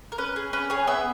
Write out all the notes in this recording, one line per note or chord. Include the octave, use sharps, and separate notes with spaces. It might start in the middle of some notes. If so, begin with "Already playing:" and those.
A#4
C#4 B4
G#4
C#4 B4
G#4 C#5
B3 E5